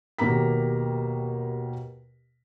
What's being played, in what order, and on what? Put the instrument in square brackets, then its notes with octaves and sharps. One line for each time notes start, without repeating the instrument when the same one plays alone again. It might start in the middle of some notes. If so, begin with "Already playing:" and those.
[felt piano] D#2 B2 A#3 G4 A#5 B6